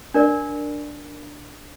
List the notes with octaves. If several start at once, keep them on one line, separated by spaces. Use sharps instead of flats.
D4 A#4 D5